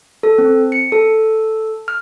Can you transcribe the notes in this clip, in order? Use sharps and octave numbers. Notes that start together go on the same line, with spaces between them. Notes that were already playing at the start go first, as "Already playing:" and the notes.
A4
C4
C#7
A4
F6